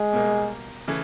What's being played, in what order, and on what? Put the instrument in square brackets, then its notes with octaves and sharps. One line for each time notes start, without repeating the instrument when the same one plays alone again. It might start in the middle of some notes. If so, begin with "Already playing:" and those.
Already playing: [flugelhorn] G#3
[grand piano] B2 G3 A#3
C#3 E3 A3